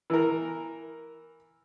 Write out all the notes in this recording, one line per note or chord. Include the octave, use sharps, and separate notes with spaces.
E3 A#4